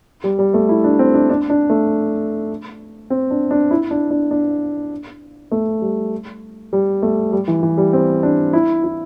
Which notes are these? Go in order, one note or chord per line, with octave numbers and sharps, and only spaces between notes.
G3
G3
A3
E4
D4
C4
D4
D4
D4
A3
C4
D4
D4
E4
D4
D4
D4
A3
G3
G3
A3
G3
E3
E3
G3
C4
D4
E4
E4